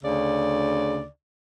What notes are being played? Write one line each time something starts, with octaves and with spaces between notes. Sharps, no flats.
D2 C#3 D5